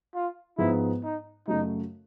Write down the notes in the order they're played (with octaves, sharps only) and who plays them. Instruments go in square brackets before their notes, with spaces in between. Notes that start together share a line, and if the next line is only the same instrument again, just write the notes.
[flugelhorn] F4
[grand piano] G#2 F3 G#3 B3 [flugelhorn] E4
[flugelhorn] D#4
[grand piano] F#2 C#3 F#3 A3 [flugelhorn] D#4